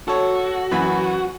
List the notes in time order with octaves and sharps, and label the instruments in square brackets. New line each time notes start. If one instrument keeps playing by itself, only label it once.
[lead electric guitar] F#4 [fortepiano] A4 C#5
[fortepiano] F#2 E3 B5